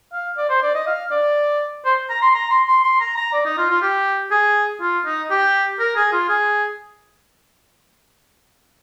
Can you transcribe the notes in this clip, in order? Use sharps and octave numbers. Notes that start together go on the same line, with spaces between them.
F5
D5
C5
D5
D#5
F5
D5
C5
A#5
C6
A#5
C6
C6
C6
A#5
A#5
D5
D#4
F4
F4
G4
G#4
F4
D#4
G4
A#4
G#4
F4
G#4